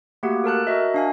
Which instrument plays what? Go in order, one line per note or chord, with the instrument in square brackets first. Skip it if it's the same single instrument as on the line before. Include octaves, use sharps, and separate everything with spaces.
[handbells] A3 A#3 F#4 G4 F#5
A4 A#4 A5 F#6
F#4 A#4 D#5 E5
D4 F5 G#5